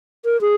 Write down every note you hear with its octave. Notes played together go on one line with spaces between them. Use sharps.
A#4
G#4